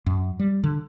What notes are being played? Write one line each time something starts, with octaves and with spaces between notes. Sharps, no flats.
F#2
G3
D3